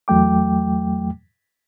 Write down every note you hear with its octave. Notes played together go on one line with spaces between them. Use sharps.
E2 F#3 A3 G5 D6